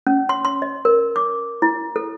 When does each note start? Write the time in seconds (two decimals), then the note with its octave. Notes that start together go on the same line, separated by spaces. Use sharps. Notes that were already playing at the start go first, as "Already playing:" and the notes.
0.07 C#4
0.29 C6
0.45 C6
0.62 D#5
0.85 A#4
1.16 D6
1.62 E4
1.96 A4